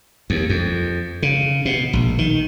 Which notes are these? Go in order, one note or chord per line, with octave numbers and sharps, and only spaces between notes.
D#2
F2
C#3
B2
A#1
D#3